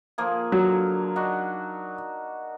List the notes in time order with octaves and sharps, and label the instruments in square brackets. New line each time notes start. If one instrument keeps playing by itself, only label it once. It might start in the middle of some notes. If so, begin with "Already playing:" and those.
[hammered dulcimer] F3 A#3 G#4
[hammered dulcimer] D3 [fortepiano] F#3
[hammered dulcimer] D4 D#4 F#4